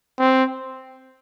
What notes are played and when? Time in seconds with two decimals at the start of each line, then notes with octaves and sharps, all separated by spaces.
0.19 C4